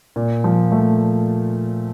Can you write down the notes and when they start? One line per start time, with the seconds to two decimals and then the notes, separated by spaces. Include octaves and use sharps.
0.16 A#2
0.44 F3
0.72 A3